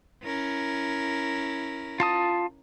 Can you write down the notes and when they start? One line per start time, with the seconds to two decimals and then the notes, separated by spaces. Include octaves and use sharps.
0.23 C#4 E4 A#4
2.00 F4 A5 D#6